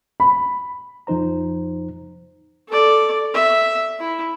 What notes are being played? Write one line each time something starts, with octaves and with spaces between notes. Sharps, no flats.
B5
F2 F3 D#4 C5 A#5
A4 D5
E5
E4